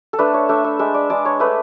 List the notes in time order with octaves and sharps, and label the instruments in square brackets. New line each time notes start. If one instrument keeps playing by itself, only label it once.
[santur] A4
A3 D4 B4
C#5
A3 D4 E5
E5
G#3 D4 E5
D5
G#3 D4 D5
C#5
A3 D4 B4